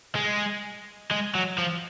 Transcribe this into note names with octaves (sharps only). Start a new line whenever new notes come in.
G#3
G#3
F#3
F3